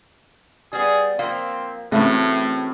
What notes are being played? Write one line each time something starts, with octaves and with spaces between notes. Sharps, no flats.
G3 B3 G#4
F3 A#3 C4 F5
A2 C#3 E3 F#3 A3 C4 E5